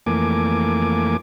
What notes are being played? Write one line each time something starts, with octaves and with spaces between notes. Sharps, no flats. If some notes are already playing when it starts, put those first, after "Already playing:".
F2 E3 A3 A#3 G#5 D6